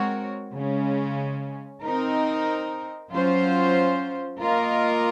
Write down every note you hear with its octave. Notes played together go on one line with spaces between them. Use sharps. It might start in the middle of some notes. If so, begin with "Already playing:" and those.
Already playing: G#3 C4 F#4 A#4 C#5
C#3 G#3 C#4
C4 D#4 A#4
F#3 C#4 F4 C5
A#3 F4 A#4 D#5